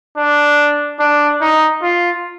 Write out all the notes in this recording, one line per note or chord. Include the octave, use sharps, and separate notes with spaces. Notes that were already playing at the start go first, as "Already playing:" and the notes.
D4
D4
D#4
F4